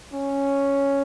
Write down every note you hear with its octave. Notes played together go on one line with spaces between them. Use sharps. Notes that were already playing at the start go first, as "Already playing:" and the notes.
C#4